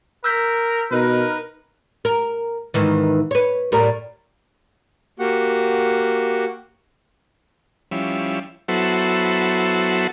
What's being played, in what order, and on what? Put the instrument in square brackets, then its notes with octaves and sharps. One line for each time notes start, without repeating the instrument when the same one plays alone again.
[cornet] A#4 [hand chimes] E6 G6 B6
[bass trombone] B2 [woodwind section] D#4 A#4 [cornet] B4
[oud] A#4
G#2 D#3 E3
B4 C#5
A2 G3 A#4
[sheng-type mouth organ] A#3 F#4 G4 F#5
[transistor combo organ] F3 G3 C#4 E4
F#3 B3 E4 F#4 A4 C5